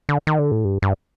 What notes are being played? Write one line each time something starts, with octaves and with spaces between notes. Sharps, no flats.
D3
D#3
D3
A2
G2
G2